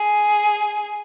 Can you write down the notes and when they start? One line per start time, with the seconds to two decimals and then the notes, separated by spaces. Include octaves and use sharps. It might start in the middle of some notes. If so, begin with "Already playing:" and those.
Already playing: G#4